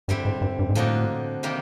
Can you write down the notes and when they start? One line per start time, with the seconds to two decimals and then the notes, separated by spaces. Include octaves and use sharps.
0.08 G2 D3 G3 C4 E4
0.25 G#2
0.41 G2
0.59 G2
0.69 G#2
0.75 A2 D3 F3 A#3 D#4 F#4
1.43 C3 D#3 G3 A#3